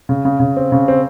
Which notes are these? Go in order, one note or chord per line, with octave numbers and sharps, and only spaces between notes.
C#3
C#3
C#3
C4
C#3
C4